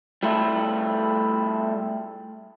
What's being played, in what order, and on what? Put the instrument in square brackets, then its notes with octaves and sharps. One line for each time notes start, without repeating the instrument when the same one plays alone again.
[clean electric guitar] G3 A3 E4 F4